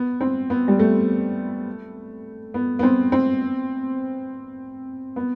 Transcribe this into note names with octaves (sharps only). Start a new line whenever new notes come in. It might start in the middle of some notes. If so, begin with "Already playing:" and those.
Already playing: B3
C4
B3
G3
A3
B3
B3
C4
C4
B3